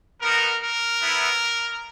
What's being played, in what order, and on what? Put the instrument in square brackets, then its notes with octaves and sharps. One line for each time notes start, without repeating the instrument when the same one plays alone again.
[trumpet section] B3 D#4 F#4 A#4
A#4
B3 E4